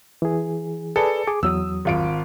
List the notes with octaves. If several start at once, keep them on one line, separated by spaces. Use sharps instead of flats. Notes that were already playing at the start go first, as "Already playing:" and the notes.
E3 G#4
G#4 A4 B4 D5
G#4 D6
E2 F#3 D#6 E6
G#1 F4 D7